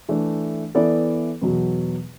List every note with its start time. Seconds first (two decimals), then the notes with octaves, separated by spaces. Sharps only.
0.09 E3 A3 D4
0.75 E3 B3 E4 A4 D5
1.41 E2 B2 F#3 B3